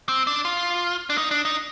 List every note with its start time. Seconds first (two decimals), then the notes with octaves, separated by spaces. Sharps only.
0.09 C4
0.27 D4
0.45 F4
1.10 D4
1.18 D#4
1.31 D4
1.45 D#4